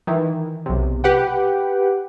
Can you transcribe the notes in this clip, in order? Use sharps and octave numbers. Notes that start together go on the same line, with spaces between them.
D#3 E3
B1 C3
G4 B4 F#5 G5